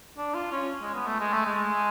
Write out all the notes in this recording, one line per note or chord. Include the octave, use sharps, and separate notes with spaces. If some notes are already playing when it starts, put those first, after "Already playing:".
D4
F4
C#4
G#3
B3
A3
G#3
A3
G#3